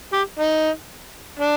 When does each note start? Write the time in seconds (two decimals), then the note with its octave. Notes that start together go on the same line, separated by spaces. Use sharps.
0.13 G4
0.39 D#4
1.39 D4